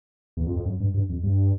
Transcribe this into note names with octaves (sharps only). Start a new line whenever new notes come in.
E2
F2
F2
F#2
G2
G2
F2
G2